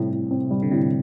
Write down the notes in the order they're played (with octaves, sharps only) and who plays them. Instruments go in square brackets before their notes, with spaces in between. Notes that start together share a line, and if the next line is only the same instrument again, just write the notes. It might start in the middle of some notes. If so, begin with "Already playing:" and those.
Already playing: [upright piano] A2 G3 C4 [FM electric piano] C3
[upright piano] A2
C4
G3
[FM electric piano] D3
[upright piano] A2 [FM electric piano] C3